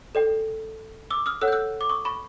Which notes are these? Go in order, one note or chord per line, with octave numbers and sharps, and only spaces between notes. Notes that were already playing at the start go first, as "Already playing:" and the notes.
A4 D5 G5
D6 E6
D#6 F6
A4 C#5 F#5 E6 F#6
G6
E6 F#6
D6
C#6 D#6
B5 C#6